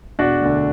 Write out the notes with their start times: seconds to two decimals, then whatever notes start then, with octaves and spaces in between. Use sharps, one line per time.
0.19 E1 D4 F#4
0.42 D2 D3